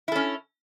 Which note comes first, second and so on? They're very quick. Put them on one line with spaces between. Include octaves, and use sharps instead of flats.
E4 A4 C#4